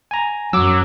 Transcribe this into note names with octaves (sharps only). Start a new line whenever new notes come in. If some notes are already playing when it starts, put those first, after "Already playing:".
G#5 A#5
F#2 F#3 D6 E6